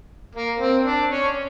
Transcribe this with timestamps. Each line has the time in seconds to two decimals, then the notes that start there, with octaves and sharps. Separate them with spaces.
0.35 A#3
0.59 C4
0.85 D4
1.10 C#4